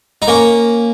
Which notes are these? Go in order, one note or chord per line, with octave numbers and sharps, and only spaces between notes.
D#4
A#3 C#4